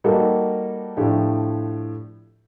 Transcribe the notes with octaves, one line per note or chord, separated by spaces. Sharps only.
G3 A#3 D#4 F#4 A4
A2 F3 A3 D4 G4